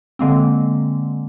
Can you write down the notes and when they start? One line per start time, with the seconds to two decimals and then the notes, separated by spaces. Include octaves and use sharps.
0.19 D3 G#3 A#3 C4